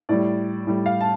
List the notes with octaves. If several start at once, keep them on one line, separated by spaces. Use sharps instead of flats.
A2 G3 D5
A2 G3
F5
A5